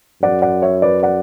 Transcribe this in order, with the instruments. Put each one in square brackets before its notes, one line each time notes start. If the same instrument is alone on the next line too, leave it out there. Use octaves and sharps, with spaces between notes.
[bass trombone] F#2 [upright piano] D5 F#5
[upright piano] D5 F#5
C#5 E5
B4 D5
D5 F#5